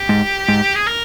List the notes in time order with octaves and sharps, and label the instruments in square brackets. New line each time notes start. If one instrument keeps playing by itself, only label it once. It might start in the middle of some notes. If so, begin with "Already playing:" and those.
Already playing: [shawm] G4
[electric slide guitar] G#2
G#2
[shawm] G#4
A#4